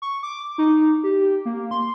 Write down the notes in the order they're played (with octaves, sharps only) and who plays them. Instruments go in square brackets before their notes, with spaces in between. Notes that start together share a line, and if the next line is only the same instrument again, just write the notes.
[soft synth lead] C#6
D6
D#4
G4
A#3
C6